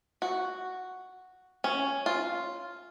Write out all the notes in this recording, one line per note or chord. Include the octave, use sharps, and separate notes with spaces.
F#4
C#4
F4